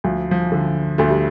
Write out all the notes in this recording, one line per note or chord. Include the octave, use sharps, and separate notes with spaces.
D2 F3
F3
D3
D2 A3
G3